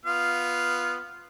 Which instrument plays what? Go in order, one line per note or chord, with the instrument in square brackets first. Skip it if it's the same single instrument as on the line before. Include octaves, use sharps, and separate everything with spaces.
[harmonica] B3 F4 F5